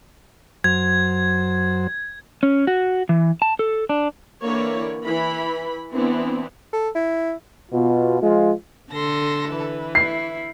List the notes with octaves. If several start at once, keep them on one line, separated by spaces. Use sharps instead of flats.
F#2 F#3 C5 G#6
C#4
F#4
E3
A5
A4
D4
D3 E3 A#3 E4 C#5 D5
E3 E4 B5
E3 B3 C4 D4 E4
A4
E4
B2 F4
F3 G#3 F4
D3 A4 C6 A#6
E3 B4
E4 C7